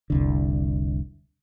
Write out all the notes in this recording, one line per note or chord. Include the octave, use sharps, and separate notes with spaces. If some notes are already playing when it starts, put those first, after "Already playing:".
F1 C2 D3